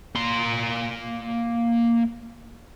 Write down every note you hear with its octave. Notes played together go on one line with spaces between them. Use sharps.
A#3 C6